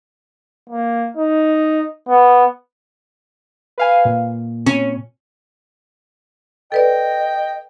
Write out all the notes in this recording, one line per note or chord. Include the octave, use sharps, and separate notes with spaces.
A#3
D#4
B3
B4 F5 G#5
A#2
C#4
A4 B4 D5 D#5 G5